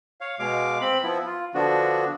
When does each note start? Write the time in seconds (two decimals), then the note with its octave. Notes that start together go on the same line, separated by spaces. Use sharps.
0.21 C#5 F5
0.39 B2 G#3 F5 D6
0.81 C4 B5
1.03 F3 B3 E4
1.26 F4
1.54 D3 F3 B3 D4 F#4